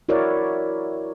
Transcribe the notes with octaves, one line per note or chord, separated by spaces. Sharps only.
E4 F#4 A#4 C#5 D5